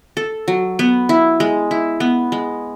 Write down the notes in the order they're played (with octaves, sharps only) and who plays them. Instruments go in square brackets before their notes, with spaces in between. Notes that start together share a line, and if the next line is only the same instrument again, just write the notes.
[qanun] A4
F#3
B3
E4
G#3
E4
B3
G#3